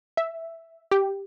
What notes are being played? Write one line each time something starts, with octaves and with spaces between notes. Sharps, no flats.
E5
G4